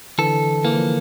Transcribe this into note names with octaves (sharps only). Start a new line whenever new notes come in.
D3 E3 A4
E3 A#3
F3